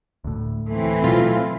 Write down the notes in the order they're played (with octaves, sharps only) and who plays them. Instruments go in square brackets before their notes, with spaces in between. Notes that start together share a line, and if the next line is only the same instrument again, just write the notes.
[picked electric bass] D2 A2
[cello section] E3 C4 [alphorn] A3
[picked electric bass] B2 F#3 [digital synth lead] F4